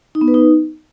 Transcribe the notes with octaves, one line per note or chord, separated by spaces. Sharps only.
D#4
B3
B4
D#4